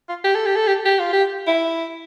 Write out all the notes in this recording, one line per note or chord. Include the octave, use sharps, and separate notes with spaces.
F4
G4
A4
G4
A4
G4
G4
F4
G4
E4